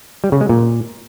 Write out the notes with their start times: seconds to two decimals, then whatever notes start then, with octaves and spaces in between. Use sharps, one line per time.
0.24 G3
0.32 C#3
0.41 G#3
0.49 A#2